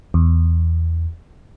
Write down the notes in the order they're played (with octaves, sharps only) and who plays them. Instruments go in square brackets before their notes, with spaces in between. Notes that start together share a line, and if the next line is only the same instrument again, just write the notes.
[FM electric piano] E2